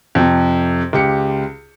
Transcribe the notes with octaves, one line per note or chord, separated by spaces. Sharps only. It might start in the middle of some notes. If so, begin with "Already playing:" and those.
F2 C3
C#2 G4 C#7